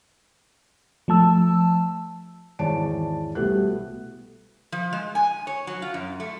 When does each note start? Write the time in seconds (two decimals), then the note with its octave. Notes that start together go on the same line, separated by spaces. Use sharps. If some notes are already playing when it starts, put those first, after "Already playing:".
1.08 F3 A3 A5 E6
2.59 G#1 E2 C#5 D5 A5 D7
3.35 C2 B2 A3 B3 G4 F#6
4.72 F3
4.93 G#3
5.15 G#5
5.47 C#5
5.67 F#3
5.82 F4
5.94 F#2
6.20 A3